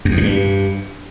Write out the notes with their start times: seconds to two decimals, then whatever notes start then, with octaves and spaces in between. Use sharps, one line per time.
0.05 F#2
0.11 E2
0.17 A#2
0.23 G2